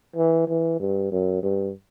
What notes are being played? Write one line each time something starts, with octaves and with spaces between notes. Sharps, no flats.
E3
E3
G2
F#2
G2